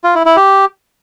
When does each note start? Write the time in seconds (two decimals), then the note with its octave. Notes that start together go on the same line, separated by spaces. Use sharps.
0.04 F4
0.15 E4
0.26 E4
0.37 G4